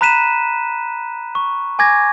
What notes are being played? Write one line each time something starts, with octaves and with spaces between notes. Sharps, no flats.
A#5 B5 F#6 B6 D#7 E7
C#6
G#5 D6 G#6 A#6